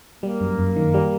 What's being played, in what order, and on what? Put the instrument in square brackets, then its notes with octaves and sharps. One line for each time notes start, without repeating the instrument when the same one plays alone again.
[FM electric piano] G3 [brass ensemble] A#3
[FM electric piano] F#2
F#2
D#3
G3